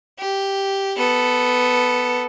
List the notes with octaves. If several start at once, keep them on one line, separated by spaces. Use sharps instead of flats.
G4
B3 A4